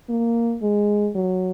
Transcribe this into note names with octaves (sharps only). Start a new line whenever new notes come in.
A#3
G#3
F#3